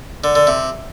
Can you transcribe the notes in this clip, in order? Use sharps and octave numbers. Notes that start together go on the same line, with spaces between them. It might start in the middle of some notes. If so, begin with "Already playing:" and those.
D3
D3
C3